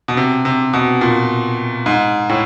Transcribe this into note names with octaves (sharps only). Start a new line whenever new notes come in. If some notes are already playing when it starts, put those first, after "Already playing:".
B2
C3
C3
B2
A#2
G#2
A2